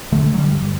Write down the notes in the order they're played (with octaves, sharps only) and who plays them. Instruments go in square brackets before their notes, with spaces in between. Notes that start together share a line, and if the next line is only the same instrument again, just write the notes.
[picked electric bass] D3 A3
D3 F#3
G3
G2